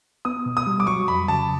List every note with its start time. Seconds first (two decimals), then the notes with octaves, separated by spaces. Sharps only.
0.25 B3 D#6
0.46 B2
0.57 D#6
0.67 G3
0.80 D6
0.87 F#3 C#6
1.08 F2 B5
1.28 C#3 A5